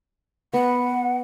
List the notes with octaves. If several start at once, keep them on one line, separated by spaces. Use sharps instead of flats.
B3 F#5